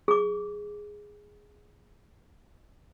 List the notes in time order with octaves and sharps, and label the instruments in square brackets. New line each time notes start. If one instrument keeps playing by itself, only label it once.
[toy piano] G#4 D6